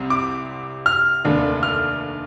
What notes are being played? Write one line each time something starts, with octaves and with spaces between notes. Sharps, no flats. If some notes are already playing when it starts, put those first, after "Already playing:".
Already playing: C2 C3 G3 C4
D6
F6
F1 D#2 D3 A3 D4
F6